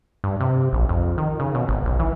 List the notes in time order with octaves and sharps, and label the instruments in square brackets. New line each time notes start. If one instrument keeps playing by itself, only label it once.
[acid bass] G2
C3
A#1
F2
D#3
C#3
B2
G#1
B1
E3